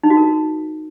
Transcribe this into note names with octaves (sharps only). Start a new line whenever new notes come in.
D#4
F#4
A#4